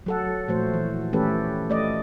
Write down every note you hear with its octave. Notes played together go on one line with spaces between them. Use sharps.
F#3 A4 F#5
A#2 F3 A3 F#4 C5
E3
E3 A3 C#4 G4 A4 B4
A3 D5 D#5